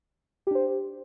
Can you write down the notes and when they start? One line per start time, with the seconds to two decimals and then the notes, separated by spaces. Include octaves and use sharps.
0.47 G4
0.51 D4
0.55 C5